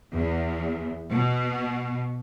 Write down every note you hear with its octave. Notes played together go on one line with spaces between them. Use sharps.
E2
B2